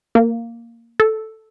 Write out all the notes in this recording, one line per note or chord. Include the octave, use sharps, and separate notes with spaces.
A#3
A4